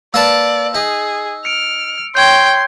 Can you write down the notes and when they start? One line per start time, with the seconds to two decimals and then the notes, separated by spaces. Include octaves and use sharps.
0.14 A#3 B4 D5 A5 E6
0.75 D#4 G#4
1.45 F6 C#7 D7
2.15 C#5 G5 C6 G6 G#6